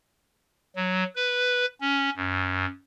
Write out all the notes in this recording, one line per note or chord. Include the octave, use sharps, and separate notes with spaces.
F#3
B4
C#4
F#2